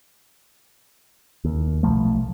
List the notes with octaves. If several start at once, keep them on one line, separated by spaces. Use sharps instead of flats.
D#2
B1 A#2 F3 A3